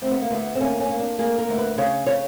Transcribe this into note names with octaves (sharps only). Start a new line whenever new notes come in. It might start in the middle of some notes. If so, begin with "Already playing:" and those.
D2 C4
B3
A#3
D2 B3
C4
A#3 C#4
C#4
A#3
D4
A#3 G#4
A#4
D2
B4
C#3 C#5
C#3 C#5